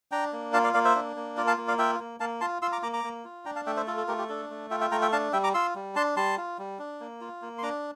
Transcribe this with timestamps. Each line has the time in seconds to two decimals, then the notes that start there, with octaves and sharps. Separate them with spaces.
0.12 D4 G5 A#5
0.33 A#3
0.53 F4 F5 A5
0.64 D5 F5
0.74 A#3 D5 F5
0.85 C5 E5
0.95 D4
1.16 A#3
1.37 F4 A#4 D5
1.47 F5 A5
1.58 A#3
1.68 D5 F5
1.79 F4 E5 G5
2.00 A#3
2.20 A#3 F5 A5
2.41 F4 A5 C6
2.62 F4 C6 E6
2.72 A#5 D6
2.83 A#3 A#5 D6
2.93 A#5 D6
3.04 A#3
3.25 F4
3.45 D4 G5 A#5
3.56 F5 A5
3.66 A3 E5 G5
3.77 C5 E5
3.87 F4 A4
3.97 A4
4.08 A3 G4 A#4
4.18 G4
4.29 D4 A4
4.50 A3
4.71 F4 E5 G5
4.81 E5 G5
4.91 A3 G5 A#5
5.02 E5 G5
5.12 D4 F5 A5
5.33 G3 E5 G5
5.44 A#5 D6
5.54 F4 C6 E6
5.75 G3
5.96 D4 A5 C6
6.16 G3 A5 C6
6.38 F4
6.58 G3
6.79 D4
7.01 A#3
7.21 F4
7.42 A#3
7.58 C6
7.63 D4 A#5 D6